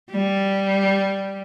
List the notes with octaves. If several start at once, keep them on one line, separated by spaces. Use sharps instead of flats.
G3